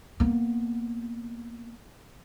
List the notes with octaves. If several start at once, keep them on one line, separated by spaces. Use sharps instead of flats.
A#3 B3